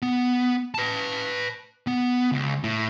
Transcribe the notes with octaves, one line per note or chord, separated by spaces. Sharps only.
B3
B4 A5
B3
C#2
A2